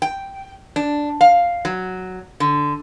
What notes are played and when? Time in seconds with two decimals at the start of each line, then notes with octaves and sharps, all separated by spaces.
0.02 G5
0.76 D4
1.21 F5
1.65 F#3
2.40 D3